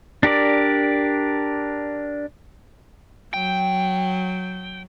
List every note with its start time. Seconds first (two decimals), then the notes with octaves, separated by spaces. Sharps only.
0.23 D4 G4 A#4 D5
3.34 F#3 G5